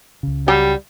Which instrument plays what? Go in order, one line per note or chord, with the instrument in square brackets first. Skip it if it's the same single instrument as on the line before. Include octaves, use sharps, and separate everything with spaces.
[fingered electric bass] C#2 C#3
[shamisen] F#3 G4 G#5 [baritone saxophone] G3